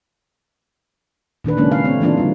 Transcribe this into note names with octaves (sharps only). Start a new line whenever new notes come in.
A#2 D#3 D4 B4
C#3 F#3 G#3 A#3 C#4 D4
F5
A3 C4 C#5
E3 F3 A#3 D4 D#4 F4
D3 G3